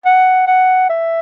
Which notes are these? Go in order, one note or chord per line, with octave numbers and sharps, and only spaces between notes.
F#5
F#5
E5